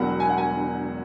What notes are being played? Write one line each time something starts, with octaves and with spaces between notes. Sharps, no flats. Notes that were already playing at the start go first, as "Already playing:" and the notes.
Already playing: E1 E2 B2 F#3 F#5
G#5
F#5
G#5